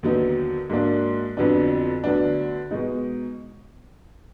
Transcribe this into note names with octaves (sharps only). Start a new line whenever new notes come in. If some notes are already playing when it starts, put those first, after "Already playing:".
D#2 D3 F#3 B3 D#4
G#2 F#3 A#3 D4
F2 D3 F#3 B3 D4
D2 D3 F#3 B3 D4
B2 G#3 D#4